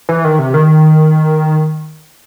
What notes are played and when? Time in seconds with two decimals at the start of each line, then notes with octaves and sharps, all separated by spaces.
0.09 E3
0.24 D#3
0.39 C3
0.54 D#3